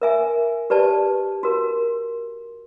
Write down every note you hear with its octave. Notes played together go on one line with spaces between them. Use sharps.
A#4 E5 G#5
G4 B4 D5 A5
F#4 A#4